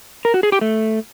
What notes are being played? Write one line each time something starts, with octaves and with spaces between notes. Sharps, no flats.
A#4
F#4
G#4
G4
A3